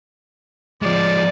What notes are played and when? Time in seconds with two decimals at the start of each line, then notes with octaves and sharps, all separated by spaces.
0.82 F3 G#3 D5